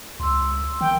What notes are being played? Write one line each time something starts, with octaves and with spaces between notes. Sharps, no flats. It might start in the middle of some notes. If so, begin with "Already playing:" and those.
C#2 C6 E6
D#3 G5